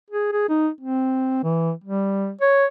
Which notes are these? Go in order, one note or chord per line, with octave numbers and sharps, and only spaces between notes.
G#4
G#4
D#4
C4
E3
G3
C#5